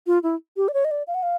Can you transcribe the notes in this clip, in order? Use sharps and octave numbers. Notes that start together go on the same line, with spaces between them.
F4
E4
G4
D5
C#5
D#5
D5
F5
F#5
F5